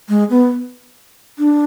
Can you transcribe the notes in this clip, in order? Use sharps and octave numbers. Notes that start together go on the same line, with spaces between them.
G#3
B3
D4